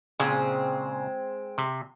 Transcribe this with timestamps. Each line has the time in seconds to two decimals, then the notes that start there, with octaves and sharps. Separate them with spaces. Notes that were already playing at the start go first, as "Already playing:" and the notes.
0.20 A#2 C#3 G#3 C4
1.58 C3